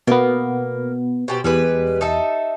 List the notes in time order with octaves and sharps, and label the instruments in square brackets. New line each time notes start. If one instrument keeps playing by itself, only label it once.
[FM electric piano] B2 B3 [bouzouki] A#3
[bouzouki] B2 G4 C5
[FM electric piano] E2 [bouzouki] G3 G#3 B4
[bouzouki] D#4 A4 E5